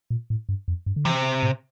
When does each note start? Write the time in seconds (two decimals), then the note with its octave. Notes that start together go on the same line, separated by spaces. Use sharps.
0.10 A#2
0.30 A2
0.49 G2
0.68 F2
0.86 G2
0.96 D3
1.05 C3 E3
1.43 A2